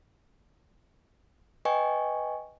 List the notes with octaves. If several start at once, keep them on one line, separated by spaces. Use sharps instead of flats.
B4 D#5 G5 G#5 C#6